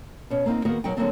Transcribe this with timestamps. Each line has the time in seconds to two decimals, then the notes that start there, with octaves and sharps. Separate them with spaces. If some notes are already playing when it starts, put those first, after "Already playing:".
0.30 B2 C#4
0.46 A#3 C4 D#4
0.65 D#3 A#3 B3 F#4 G#4 A#4
0.84 B2 F#3 D#4 A#4 C#5 G5
0.97 D3 F#3 G3 A#3 C4 D4